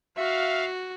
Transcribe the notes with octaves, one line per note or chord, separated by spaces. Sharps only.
F#4 E5 F5